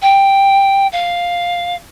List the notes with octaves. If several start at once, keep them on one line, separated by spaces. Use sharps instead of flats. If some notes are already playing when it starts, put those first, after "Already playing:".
G5
F5